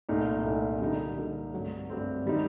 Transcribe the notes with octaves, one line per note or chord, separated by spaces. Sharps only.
C2 A#2 A3 D#4
C2 A#2 A3 D#4
D3 G3 A#3 D#4 A4
D3 G3 A#3 D#4 A4
G2 F#3 A3 C4
G2 F#3 A3 C4
D#3 G3 C4 D#4